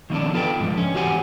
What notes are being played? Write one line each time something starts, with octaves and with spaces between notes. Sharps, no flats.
D#3 F3 B3 C#4 D4
F4 A4 B4 G5
G#2 D3 F3
C#4
E2 F#4 G4 C5 F#5 G#5